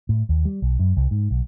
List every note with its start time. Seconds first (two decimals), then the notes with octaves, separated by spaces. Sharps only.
0.09 A2
0.29 D#2
0.45 G3
0.62 B1
0.79 F#2
0.97 C2
1.11 G#2
1.31 B1